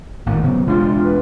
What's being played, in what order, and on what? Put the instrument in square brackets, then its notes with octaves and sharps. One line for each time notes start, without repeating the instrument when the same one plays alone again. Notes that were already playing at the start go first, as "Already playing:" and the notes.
[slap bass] G#1 A2 [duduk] A#3
[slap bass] C#3 B3 [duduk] F#3
[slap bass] E1 G#3 D4 [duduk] F4
[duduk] B4